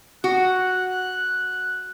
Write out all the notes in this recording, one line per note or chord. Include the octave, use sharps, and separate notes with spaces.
F#4 F#6